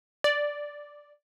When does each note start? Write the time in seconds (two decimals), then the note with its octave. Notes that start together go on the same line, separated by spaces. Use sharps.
0.24 D5